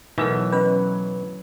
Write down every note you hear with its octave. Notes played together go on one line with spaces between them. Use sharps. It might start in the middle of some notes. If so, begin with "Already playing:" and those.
B2 E3 F#3 A3 D#4 A#4 E5
C#4 B4 D#5